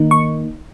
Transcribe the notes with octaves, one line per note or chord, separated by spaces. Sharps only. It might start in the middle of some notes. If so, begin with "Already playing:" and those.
Already playing: D#3 A#3 D#4
C#6